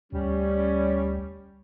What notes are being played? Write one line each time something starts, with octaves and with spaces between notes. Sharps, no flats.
D2 G3 C#4